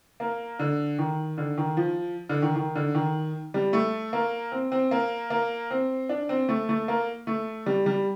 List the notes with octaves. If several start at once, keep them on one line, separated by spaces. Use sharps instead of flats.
A#3
D3
D#3
D3
D#3
F3
D3
D#3
D#3
D3
D#3
G3
A3
A#3
C4
C4
A#3
A#3
C4
D4
C4
A3
A3
A#3
A3
G3
G3